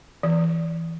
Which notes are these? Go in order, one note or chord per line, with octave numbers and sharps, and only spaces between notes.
E3